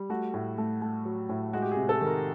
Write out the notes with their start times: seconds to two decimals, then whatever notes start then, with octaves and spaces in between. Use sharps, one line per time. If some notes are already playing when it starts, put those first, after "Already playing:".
Already playing: G3
0.10 A3 F#4
0.34 A2
0.58 A3
0.82 A3
1.05 F#3
1.29 A2
1.53 G#3 F#4
1.62 G4
1.72 C3 G#4
1.89 A4
2.01 D#3
2.06 A#4